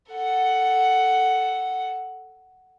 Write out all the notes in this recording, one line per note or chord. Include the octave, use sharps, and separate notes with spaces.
A4 F#5